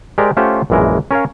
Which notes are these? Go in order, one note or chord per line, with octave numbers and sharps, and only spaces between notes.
G#3 G4 A#4 C5 D5
A3 C#4 F4 G4 C5 F#5
A#1 F#2 E3 G#3 A#4
C#4 A#4 C#5 F5